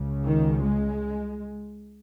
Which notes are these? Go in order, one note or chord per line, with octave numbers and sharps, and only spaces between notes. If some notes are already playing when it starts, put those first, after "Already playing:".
Already playing: C#2 C#3
D#3
G#3